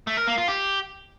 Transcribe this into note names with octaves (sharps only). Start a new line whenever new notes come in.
A3
A#4
A#3
F4
G4